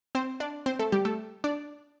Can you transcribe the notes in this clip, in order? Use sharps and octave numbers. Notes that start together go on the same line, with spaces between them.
C4 C5
D4 D5
C4 C5
A3 A4
G3 G4
A3 A4
D4 D5